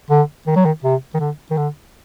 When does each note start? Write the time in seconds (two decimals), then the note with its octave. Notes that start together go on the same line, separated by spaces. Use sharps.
0.10 D3
0.47 D#3
0.56 F#3
0.65 D#3
0.84 C3
1.14 D#3
1.20 D3
1.51 D#3
1.57 D3